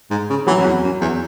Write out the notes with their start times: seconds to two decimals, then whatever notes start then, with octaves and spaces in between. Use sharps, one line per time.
0.11 G#2
0.29 C#3
0.47 E3 F#3
0.60 F#2
0.66 E2
0.84 F#2
1.01 E2